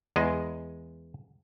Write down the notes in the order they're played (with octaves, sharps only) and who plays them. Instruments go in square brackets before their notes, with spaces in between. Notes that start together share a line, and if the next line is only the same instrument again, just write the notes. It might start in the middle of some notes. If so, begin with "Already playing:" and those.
[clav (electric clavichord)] E2 G#3 D#5